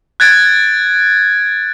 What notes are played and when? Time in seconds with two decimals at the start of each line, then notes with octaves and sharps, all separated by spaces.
0.20 F#6 G#6 A6 D7